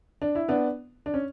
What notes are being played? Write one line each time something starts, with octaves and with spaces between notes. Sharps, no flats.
D4
E4
B3 D4
D4
C#4